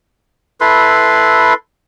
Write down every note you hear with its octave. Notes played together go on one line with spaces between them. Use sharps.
E4 A4 B4 C6